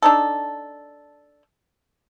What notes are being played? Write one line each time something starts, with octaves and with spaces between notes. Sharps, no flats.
D4 D#4 A4